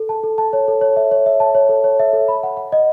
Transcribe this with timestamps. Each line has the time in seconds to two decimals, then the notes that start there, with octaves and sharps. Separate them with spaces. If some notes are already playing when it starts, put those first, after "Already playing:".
Already playing: A4
0.09 A5
0.24 A4
0.38 A5
0.53 C#5
0.68 A4
0.81 C#5
0.97 E5
1.12 C#5
1.26 E5
1.40 A5
1.55 C#5
1.69 A4
1.84 C#5
1.99 E5
2.13 A4
2.28 B5
2.43 F#5
2.57 F#5
2.72 D#5